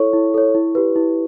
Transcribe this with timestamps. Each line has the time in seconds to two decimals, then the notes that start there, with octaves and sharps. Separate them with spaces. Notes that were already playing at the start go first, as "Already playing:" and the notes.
Already playing: E4 A4 C#5 C#6
0.13 E4
0.34 A4 C#5
0.55 E4
0.75 G4 B4
0.96 E4